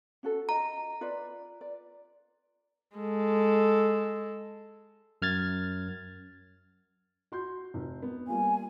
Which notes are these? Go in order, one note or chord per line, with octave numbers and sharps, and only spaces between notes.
C#4 F#4 A4
F4 D#5 A#5
F4 B4 D5
D5
G#3 A4
F#2 F6 G#6 A6
F#4 C6 G6
F1
B3
G3 A#3 F4 G#5